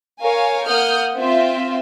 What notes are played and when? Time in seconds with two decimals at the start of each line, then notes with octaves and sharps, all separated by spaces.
0.21 A#4 C#5 F5 G#5
0.67 A#3 F#5 D#6 F6 G6
1.17 C4 F4 E5